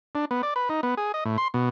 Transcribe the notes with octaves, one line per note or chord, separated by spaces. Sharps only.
D4
B3
D5
B4
D#4
B3
G#4
D#5
A2
C6
B2